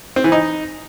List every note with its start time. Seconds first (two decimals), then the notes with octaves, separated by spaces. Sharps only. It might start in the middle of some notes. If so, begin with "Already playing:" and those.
0.16 C4
0.24 E3
0.32 D#4